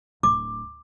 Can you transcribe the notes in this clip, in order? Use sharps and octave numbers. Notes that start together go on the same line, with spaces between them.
D1 D6